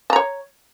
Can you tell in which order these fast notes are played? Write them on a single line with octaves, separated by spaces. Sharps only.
A5 A#5 C#5